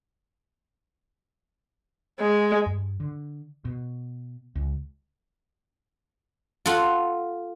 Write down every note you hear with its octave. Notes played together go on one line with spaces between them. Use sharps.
G#3
G2
D3
B2
C#2
F4 A4 F#5